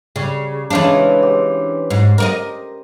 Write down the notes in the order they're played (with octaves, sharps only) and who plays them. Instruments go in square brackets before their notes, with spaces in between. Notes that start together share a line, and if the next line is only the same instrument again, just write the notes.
[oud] C#3 [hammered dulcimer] G3
[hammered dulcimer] C#3 G#3 [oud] E3 C#4 D4
[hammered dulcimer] G4 C5
[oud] G#2
A#4 D5 D#5